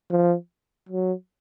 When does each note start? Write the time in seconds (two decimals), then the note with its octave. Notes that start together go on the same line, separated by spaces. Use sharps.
0.11 F3
0.89 F#3